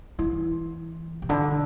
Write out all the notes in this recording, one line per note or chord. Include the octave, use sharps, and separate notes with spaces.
E3 E4
C3
D3 D4